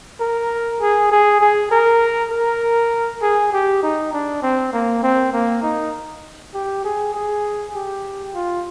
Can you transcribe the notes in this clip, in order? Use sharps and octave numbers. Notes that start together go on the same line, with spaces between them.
A#4
G#4
G#4
G#4
A#4
A#4
G#4
G4
D#4
D4
C4
A#3
C4
A#3
D#4
G4
G#4
G#4
G4
F4